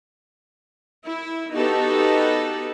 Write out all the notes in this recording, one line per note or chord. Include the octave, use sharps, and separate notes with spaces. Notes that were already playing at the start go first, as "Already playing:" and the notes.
E4
B3 D#4 F#4 G4 A4 B4